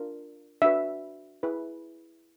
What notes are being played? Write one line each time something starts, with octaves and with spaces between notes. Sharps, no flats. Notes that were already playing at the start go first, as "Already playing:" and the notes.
Already playing: D4 F4 A#4
D4 F#4 B4 E5
E4 G#4 B4